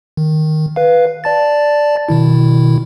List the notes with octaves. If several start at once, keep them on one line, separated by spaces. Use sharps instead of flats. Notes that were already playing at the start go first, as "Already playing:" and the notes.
D#3
B4 F5
D5 A5 A6
B2 D#3 E4